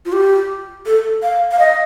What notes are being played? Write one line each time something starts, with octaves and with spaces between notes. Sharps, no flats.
F4
G4
A4
F5
F5
D#5